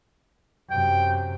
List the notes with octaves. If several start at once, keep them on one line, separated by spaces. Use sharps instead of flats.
F#2 C3 G5